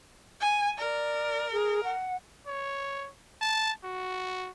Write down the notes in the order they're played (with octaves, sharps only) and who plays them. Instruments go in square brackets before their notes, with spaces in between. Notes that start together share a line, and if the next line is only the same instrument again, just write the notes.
[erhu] G#5
[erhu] A#4 [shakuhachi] D5
[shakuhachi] G#4
F#5
[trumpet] C#5
A5
F#4